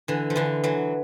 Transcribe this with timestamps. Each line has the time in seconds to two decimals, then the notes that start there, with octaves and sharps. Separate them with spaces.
0.08 D3 E3
0.30 F3
0.36 D3 E3
0.63 E3 F#3